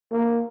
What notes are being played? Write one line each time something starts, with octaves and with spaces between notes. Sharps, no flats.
A#3